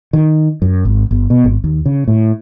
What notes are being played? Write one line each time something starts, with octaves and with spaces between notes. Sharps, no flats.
D#3
F#2
G#1
G1
B2
G#1
D#2
C#3
A2